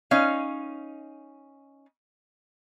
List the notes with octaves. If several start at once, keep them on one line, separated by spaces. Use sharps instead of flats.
C#4 D#4 F5